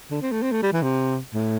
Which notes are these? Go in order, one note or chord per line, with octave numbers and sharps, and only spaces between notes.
D3
C4
A3
C4
A3
G3
E3
C3
A2